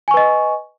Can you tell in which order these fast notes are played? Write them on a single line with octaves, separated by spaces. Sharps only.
G#5 C#6 B4 D#5